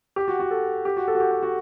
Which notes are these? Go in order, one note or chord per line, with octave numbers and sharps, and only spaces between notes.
G4
F#4
F#4
A4
G4
F#4
A4
F#4
G4
F#4
F#4